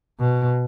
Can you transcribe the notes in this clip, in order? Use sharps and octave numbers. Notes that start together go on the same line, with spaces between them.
B2